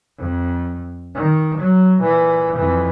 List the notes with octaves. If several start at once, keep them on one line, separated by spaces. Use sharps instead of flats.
F2
D#3
F#3
A#2 E3
F2 E3